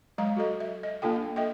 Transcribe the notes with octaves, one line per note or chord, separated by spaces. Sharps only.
F#3 G#3 F5 A#5
F#4 A4 D#5
E5
D#5
A#3 D4 F4 A4 G5
A4 D#5 E5 G5